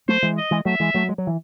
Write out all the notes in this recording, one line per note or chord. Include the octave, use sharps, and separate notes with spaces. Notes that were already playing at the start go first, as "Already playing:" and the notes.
F#3 A3 C5
E3 G#3
D#5
E3 G#3
F#3 A3 E5
E3 G#3
F#3 A3
G#3
F#3
E3